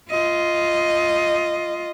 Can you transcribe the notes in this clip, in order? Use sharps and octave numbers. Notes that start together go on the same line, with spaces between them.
F4 D#5